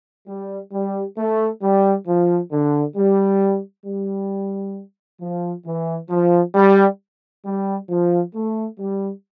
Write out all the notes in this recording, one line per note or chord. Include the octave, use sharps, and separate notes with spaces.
G3
G3
A3
G3
F3
D3
G3
G3
F3
E3
F3
G3
G3
F3
A3
G3